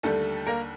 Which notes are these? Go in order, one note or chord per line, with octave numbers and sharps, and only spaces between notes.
D#2 D3 G3 A3 A4
A#3 A#4